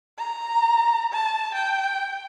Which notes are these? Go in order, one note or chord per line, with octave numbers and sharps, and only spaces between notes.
A#5
A5
G5